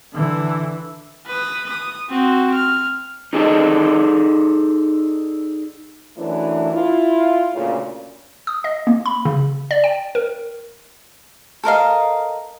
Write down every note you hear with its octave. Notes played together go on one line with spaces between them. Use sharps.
D3 E3
B4 D#6
D#6
C4 F#4
F6
D#4 G#4 A4 D5 D#5
F#2 E3 A3 D4
E4 F4
D2 A#2 C#3
D#6
D#5
A#3
B5
C#3
D5
G5
A#4
A4 A#4 D#5 F5